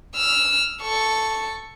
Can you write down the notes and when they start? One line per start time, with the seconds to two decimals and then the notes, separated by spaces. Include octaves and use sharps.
0.16 E6 F6
0.82 A4 C#6